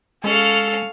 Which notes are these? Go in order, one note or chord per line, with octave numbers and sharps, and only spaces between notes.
G#3 C#4 A4 F5